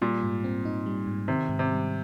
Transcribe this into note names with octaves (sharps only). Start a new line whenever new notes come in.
A#2 G3
G#2
C4
D#4
G3
G#2
C3 D#3
G#2
C3
G3